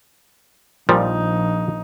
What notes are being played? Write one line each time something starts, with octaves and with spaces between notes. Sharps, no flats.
A#1 A#2 F3 G3 D#4